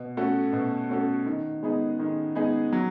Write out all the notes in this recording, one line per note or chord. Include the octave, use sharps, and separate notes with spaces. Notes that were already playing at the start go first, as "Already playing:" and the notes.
Already playing: B2
A3 C#4 F#4 A4
B2
A3 C#4 F#4 A4
D#3
G#3 B3 D#4 G#4
D#3
G#3 B3 D#4 G#4
F#3